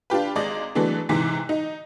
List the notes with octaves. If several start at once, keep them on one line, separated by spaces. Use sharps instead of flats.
D4 F4 G4 B4
G#1 G#3 D5 D#5
E3 F#3 G#3 A3 B3 D4
G#2 C3 E3 B6
D#4